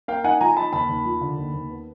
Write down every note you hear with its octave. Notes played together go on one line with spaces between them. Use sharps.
A#3 F5 G5
D#4 F#5 G#5
F3 G#5 A#5
D#4 A5 B5
D#2 A5 B5
D#2
F3
D3
D#2
D#2
B3